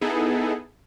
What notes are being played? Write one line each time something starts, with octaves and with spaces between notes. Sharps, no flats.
B3 D#4 E4 G#4 A4